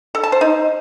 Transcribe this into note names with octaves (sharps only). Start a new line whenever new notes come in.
A4
A5
C5
D#4